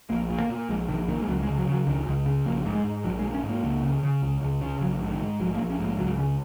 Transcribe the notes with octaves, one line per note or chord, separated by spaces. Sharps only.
A#1 A#3
A#2
A#3
A#2
A#1 G#3
A#1 D#3
A#2 D#3
G#3
C#2 F#3
G#3
C#3
F#3
C#3
F#3
C#2 D#3
C#2
C#3
A#1 A#3
G#2
G#3
G#2
A#1 F#3
G#3
A#1
C#4
G#2
A#3
C#2
C#3
C#3
C#2
C#2
C#3
A#1 F#3
G#2
D#3
G#2
A#1 F#3
A#3
A#1
C#4
G#2
A#3
C#2 F#3
C#3